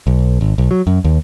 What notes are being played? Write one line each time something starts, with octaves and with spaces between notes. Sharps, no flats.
B1
G#1
B1
F#3
F#2
D#2